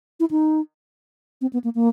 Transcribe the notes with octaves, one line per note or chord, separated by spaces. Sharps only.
E4
D#4
C4
B3
A#3
A#3